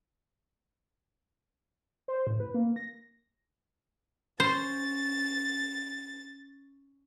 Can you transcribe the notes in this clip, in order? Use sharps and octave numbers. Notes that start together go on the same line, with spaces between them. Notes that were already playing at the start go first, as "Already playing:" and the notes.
C5
A2
B4
A#3
A#6
C#4 C5 A6